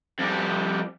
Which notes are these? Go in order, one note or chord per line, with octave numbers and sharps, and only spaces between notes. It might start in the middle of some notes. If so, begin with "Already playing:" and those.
F2 G3